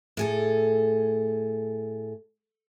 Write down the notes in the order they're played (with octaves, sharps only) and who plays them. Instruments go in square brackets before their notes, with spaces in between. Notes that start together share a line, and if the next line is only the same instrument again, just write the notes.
[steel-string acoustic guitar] A2 G#4 A4